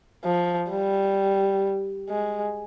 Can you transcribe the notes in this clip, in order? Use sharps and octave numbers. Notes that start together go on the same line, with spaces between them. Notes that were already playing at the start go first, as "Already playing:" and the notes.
F3
G3
G#3